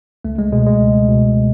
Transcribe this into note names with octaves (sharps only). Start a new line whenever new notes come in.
C#2 A3
G#3
B2 G#3
G#3
C#2
B2